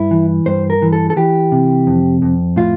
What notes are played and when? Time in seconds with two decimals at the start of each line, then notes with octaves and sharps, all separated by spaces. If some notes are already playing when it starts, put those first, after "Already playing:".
Already playing: G2 E4
0.11 E3
0.46 G2 C5
0.70 A#4
0.82 E3
0.93 A4
1.10 A4
1.16 E3 G4
1.52 C3
1.87 F2
2.22 F2
2.56 A2 F4